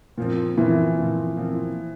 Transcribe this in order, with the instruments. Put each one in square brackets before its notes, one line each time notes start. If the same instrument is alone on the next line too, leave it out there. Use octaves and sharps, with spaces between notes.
[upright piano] A#2 F3 C4
[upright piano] A#2 F3 C4 [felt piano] E3
[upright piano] A#2 F3 C4
A#2 F3 C4